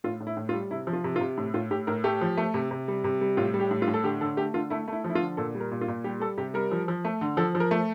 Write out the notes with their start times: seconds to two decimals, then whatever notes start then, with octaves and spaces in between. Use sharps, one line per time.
0.04 A2 F4
0.20 A2
0.27 E4
0.37 A2
0.49 F4
0.53 G3
0.71 C3 E4
0.87 F3
0.93 F4
1.04 C3
1.16 F4
1.21 C3
1.38 A2
1.54 A2 F4
1.71 A2 G4
1.87 A2 A#4
2.04 A3 G4
2.21 F3
2.37 A3
2.54 C3
2.71 C3
2.88 G3
3.04 C3
3.21 G3
3.37 A2 F4
3.54 G3
3.60 G4
3.71 A2
3.82 F4
3.88 A2
3.94 A4
4.04 D3 G4
4.21 D3 A4
4.37 A3 G4
4.54 D3 F4
4.70 A3 E4
4.88 A3
4.93 E4
5.04 F3
5.10 E4
5.15 F4
5.21 D3
5.37 A#2 A4
5.55 G3
5.60 A#4
5.71 A#2
5.81 F4
5.88 A#2
6.04 G3 G4
6.20 G3 A4
6.38 C3 G4
6.54 G3 A#4
6.71 F3
6.88 F3
7.05 A3
7.21 D3
7.37 F3 A4
7.55 F3
7.60 A#4
7.71 A3